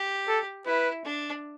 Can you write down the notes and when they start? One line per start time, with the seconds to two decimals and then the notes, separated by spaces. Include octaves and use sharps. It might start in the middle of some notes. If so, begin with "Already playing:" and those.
Already playing: G4
0.28 A4
0.66 E4 B4
1.04 D4